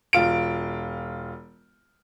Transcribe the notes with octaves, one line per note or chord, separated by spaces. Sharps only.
E1 F4 D7